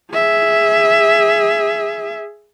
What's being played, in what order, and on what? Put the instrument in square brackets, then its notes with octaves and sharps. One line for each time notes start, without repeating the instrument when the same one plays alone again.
[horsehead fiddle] G#4 E5